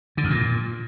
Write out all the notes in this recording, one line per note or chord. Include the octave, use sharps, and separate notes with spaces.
D3
E2
A#2